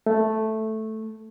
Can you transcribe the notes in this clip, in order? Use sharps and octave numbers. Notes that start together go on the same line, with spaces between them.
A3